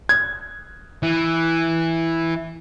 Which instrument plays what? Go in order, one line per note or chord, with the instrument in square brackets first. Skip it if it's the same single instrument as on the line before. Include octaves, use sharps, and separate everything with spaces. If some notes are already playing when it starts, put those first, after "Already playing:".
[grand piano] G#6
[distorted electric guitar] E3